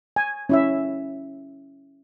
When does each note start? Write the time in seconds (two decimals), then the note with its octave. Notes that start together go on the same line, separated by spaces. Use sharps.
0.16 G#5
0.49 C#4 E4 E5